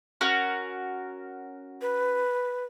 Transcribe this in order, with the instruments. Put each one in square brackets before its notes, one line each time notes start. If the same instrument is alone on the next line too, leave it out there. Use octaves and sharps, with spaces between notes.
[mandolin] C#4 F#4 A#4
[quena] B4